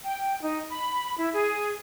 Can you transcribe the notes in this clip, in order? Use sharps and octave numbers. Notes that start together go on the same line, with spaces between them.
G5
D#4
B5
E4
G#4